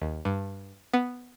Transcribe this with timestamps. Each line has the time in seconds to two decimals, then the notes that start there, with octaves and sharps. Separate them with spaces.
0.02 D#2
0.25 G2
0.94 B3